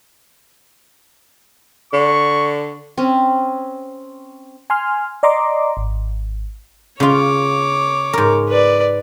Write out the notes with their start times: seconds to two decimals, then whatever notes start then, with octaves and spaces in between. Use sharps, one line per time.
1.93 D3 C#6
2.97 C4 C#4
4.70 G#5 C6 F6
5.23 D5 D#5 A#5 C6 D6
5.77 G#1
7.00 C#3 F4 C#5 D6
8.13 G#2 A#4
8.49 B4 D5